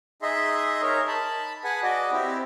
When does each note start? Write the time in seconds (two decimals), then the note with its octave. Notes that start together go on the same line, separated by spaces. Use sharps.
0.22 D#4 G#4 D#5 E5 C6
0.82 D#4 A#4 C#5
1.08 A5 B5
1.64 G#4 B4 F#5 G#5
1.83 F#4 D5 D#5
2.12 C4 E4 G4